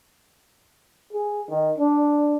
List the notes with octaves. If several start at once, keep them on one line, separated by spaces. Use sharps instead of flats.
G#4
D#3
D4